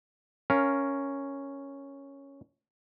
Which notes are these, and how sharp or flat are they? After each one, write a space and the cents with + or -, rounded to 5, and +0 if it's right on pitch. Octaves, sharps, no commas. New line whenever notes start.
C#4 +0 A#4 +0 F5 +0